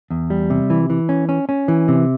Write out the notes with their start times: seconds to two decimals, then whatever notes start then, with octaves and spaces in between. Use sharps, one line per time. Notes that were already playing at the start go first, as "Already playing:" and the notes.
0.10 E2
0.30 G3
0.50 C3
0.70 E3
0.90 E3
1.09 C#4
1.29 C#4
1.49 C#4
1.68 E3
1.88 C3